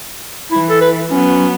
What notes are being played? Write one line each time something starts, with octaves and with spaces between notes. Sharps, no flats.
E3 E4
A4
B4
F#3 B3 C#4